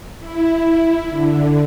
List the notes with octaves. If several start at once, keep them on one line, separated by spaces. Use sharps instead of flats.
E4
D3